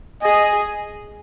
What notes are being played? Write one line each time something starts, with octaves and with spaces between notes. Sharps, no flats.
G#4 D#5